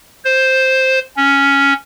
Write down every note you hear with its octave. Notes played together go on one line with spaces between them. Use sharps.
C5
C#4